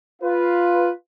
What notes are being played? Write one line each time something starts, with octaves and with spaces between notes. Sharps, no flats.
F4 B4